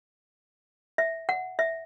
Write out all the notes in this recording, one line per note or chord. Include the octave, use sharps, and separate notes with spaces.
E5
F#5
E5